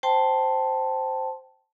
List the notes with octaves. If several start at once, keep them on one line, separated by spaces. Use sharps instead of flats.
C5 G5 A5 C6